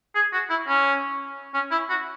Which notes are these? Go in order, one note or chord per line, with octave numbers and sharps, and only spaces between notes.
G#4
F#4
E4
C#4
C#4
E4
F#4